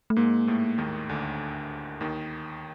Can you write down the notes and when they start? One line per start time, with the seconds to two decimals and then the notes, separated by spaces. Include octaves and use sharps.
0.10 A3
0.16 G#2 G#3 A#3
0.47 A2 A3
0.78 D#2 D#3
1.09 D2 D3
2.01 D#2 D#3